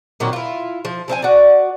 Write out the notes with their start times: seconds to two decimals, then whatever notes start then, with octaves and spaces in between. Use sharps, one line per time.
0.20 A#2 D#3 F#3 C4
0.33 E4 F4
0.85 F3
1.08 F3 C4 E5 G#5
1.22 F#4 D5